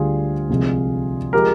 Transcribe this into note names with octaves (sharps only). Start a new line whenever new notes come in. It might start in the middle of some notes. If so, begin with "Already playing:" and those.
Already playing: D2 D3 G3 F4 G#4
C2 C3 F3 G#3
F3 G#3 G4 A#4